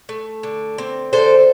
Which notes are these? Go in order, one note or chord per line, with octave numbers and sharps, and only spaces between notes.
A3
D3
C4
D3 A4 C5